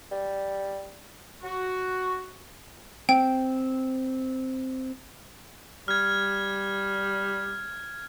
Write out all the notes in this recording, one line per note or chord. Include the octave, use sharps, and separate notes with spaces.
G3
F#4
C4 G5
G3 F6 G#6